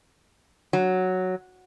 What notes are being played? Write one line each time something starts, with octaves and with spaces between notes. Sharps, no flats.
F#3